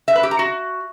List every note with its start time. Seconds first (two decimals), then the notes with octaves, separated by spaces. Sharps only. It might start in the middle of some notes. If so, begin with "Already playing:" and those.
0.08 E5
0.16 B4
0.23 G4
0.31 A#5
0.39 F#4